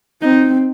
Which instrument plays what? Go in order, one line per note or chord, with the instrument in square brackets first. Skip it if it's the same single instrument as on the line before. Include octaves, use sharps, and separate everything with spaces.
[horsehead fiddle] C4 [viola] D#4